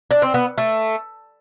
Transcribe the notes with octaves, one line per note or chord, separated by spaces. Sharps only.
D4
C4
B3
A3